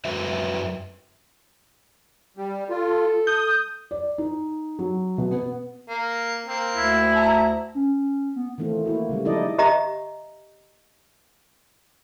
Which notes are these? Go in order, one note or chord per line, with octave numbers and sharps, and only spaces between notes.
F#2 F#4 B4 E5
G3
F4 A4
D#6 G6
D5
D#4
F#3
B2
B3
A#3
A#3 C4
D2 E4
A5 A#5
C#4
B3
D#3 E3 A3 C4 F4
A#3 E4 F#4
C#3 G3 G#3
F3 D#4 E4 A4 D5 D#5
G4 D#5 E5 A#5